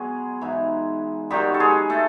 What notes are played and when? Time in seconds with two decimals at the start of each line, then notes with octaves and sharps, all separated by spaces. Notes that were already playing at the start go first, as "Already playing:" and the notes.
Already playing: B2 F#3 G#3 G#4
0.41 G#2 E3
1.30 F#2 D#3 F#3 G3 G4
1.54 A4
1.60 G#3 G#4
1.90 A3 A4